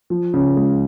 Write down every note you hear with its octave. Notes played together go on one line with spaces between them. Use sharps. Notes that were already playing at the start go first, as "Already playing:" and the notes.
F3
C#3
G#3